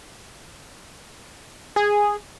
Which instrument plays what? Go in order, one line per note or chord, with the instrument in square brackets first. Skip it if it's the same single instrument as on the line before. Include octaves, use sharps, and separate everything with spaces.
[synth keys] G#4